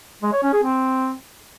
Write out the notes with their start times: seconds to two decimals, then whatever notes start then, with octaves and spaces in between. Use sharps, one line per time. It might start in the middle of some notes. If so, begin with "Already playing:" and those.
0.23 G#3
0.33 C#5
0.43 C#4
0.53 G#4
0.63 C4